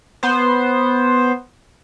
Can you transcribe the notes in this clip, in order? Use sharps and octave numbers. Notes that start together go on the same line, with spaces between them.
B3 C5